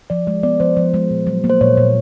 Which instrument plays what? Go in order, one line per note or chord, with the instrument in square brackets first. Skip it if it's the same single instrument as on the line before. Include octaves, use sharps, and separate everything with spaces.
[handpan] F3 [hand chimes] D5
[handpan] G#3 [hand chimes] D5
[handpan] B3 [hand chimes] D5
[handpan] F3 [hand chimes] C5
[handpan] F3
G#3
A#2
F#3
A#3
[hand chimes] C5
[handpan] A#2 [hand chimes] C#5
[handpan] A#2